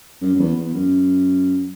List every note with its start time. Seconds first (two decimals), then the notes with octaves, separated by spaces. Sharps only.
0.22 F#2
0.36 F#2
0.39 E2
0.56 E2
0.74 F#2